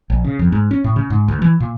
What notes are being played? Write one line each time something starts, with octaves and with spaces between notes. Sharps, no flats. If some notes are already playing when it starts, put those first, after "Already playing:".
A#1
C#3
F2
G#2
C#4
A2
C#3
G#2
D2
E3
A#2